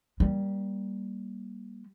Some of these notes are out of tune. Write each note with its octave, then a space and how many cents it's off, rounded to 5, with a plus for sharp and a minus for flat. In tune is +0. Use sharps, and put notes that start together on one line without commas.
G3 +0 A#3 +25